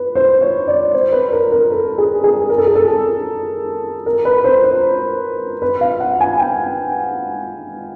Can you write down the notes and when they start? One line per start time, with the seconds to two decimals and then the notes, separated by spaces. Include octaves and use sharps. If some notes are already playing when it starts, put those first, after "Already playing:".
Already playing: B4
0.15 C5
0.41 C#5
0.68 D5
0.93 C5
1.12 B4
1.32 A#4
1.52 A#4
1.71 A4
1.98 G#4
2.24 G#4
2.49 A#4
2.58 A4
2.67 G#4
2.75 A4
4.06 A#4
4.25 B4
4.44 C5
4.64 C5
5.62 B4
5.81 F5
6.00 F#5
6.21 G#5
6.40 G5